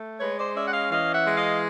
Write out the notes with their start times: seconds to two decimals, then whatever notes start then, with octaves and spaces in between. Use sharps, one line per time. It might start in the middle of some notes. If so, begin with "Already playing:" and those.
Already playing: A3
0.20 G#3 B4 C#5
0.38 C5 D5
0.55 C#4 D5 E5
0.67 F#5
0.73 D#5 F5
0.91 E3 D#5 F5
1.14 E5 F#5
1.26 G#3
1.37 D#5 F5